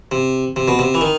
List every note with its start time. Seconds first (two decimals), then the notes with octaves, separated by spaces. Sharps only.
0.12 C3
0.56 C3
0.68 B2
0.79 C3
0.94 E3
1.01 D#3